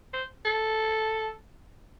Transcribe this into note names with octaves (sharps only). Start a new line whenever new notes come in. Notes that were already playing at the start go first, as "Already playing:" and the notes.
C5
A4